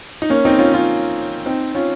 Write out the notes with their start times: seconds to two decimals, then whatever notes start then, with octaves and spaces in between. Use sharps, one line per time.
0.22 D#4
0.30 A#3 C#4
0.45 C4 D#4
0.59 C#4 F4
0.74 C#4 F4
1.46 C4 D#4
1.75 C#4 F4